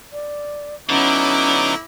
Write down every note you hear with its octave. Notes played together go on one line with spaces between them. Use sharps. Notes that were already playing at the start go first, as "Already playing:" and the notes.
D5
D3 F#3 B3 C#4 D#4 E4 D6